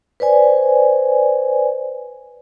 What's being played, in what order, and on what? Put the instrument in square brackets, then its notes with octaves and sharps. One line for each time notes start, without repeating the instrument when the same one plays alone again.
[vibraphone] B4 C5 D5 G#5